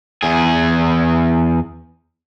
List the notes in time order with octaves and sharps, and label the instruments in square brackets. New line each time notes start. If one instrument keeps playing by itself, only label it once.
[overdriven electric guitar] E2 G#4